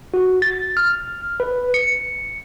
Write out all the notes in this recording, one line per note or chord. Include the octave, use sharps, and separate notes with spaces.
F#4
A6
F6
B4
C#7